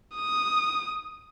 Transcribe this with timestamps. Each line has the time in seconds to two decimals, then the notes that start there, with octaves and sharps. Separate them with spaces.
0.16 D#6